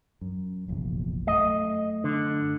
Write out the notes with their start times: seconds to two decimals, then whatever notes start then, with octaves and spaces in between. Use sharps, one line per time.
0.21 F#2
0.68 F1 A#1 E2
1.27 F#2 A3 D#5
2.04 D3